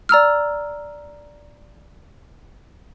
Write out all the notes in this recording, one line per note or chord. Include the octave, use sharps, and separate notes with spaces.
D5 A#5 E6 F6